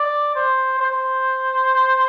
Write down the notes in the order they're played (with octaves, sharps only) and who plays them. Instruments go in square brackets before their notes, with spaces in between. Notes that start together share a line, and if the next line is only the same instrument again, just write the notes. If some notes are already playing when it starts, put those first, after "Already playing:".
Already playing: [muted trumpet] D5
C5
C5